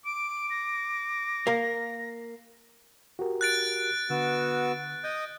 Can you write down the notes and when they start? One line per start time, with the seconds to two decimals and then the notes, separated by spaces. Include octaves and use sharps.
0.05 D6 D7
0.50 A#6
1.47 A#3 A#4
3.19 F#4 G4 A#4
3.41 F#6 A6 D7
4.10 D3 B3 F#4 E6
5.04 D#5 D#6 G6